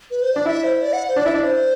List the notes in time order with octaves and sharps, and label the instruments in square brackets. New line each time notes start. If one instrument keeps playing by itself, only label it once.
[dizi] B4
C5
[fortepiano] D4 [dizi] D5
[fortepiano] E4 [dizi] E5
[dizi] C5
D5
F#5
C5
[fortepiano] D4 [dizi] D5
[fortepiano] E4 [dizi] E5
[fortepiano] D4 [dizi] D5
[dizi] C5